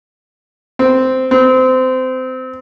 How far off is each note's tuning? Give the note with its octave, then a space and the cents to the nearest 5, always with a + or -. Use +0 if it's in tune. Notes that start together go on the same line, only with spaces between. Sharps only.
C4 -10
C4 -25